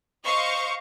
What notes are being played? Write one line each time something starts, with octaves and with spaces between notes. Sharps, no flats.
C5 D#5 F5 C#6